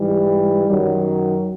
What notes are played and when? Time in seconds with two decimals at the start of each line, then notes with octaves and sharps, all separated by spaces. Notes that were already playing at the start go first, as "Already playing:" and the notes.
Already playing: G#2 E3 G3
0.65 F#2 D#3 F#3